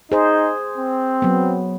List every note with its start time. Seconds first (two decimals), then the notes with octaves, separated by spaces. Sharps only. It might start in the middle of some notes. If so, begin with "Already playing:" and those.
0.12 D#4 G#4 C5
0.78 C4
1.22 F#3 B3